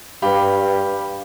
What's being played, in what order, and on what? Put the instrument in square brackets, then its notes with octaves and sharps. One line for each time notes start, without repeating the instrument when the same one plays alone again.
[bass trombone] G2 [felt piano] G4 B4 [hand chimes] F5 B5